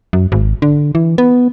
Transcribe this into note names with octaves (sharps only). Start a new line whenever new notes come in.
F#2
G#1
D3
E3
B3